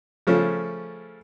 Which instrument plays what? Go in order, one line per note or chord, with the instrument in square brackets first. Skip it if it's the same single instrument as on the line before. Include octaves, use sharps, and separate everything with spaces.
[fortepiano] C#3 F3 A3 C#4